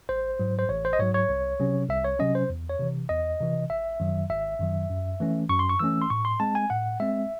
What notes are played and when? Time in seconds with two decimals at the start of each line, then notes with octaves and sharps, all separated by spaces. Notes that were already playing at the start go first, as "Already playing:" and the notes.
0.09 A1 C5
0.39 G#2 F#3
0.59 C5
0.69 A1 C#5
0.85 C5
0.93 D#5
0.99 G#2 F#3 C#5
1.14 C#5
1.29 C2
1.60 C3 F#3 C#4
1.89 C2 E5
2.04 C#5
2.19 C3 F#3 C#4 D#5
2.35 C5
2.49 E2
2.69 C#5
2.80 C3 E3
3.09 E2 D#5
3.40 C3 E3
3.70 G#1 E5
4.00 F#2 D#3 F#3
4.30 G#1 E5
4.60 F#2 D#3 F#3
4.90 F#2
5.20 E3 A3 C#4
5.49 F#2 C#6
5.59 C6
5.69 C#6
5.79 E3 A3 C#4 E6
6.01 C6
6.10 A2 C#6
6.25 C6
6.40 G#3 C4 A5
6.55 G#5
6.70 A2 F#5
7.00 G#3 C4 E5